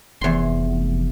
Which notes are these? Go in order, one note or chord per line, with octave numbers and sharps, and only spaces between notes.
F1 E2 C6